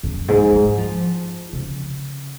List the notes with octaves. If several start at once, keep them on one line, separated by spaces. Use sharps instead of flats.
F#2
G#2
F#3
F3
C#3